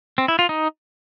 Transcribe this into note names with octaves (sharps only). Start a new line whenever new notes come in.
C4
E4
F4
D#4